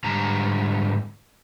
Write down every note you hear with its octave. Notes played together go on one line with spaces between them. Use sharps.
G#2 D3 G3 A#5